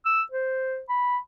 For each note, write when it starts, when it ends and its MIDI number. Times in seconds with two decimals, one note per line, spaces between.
0.06 0.22 88
0.32 0.80 72
0.89 1.18 83